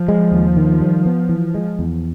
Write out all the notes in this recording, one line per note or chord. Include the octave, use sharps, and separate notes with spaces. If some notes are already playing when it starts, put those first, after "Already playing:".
Already playing: F3
G#3
D#2
D#3
G3
B3
E3
G#3
E2